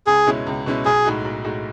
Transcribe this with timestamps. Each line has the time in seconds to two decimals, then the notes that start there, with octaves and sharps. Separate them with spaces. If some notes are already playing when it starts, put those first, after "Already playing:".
0.07 C#2 G#4
0.27 B2 G#3 C#4 E4
0.47 C#2
0.66 B2 G#3 C#4 E4
0.85 B1 G#4
1.05 A2 G#3 D#4 F#4
1.25 B1
1.44 A2 G#3 D#4 F#4